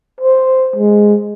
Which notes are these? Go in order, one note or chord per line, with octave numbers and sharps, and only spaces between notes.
C5
G#3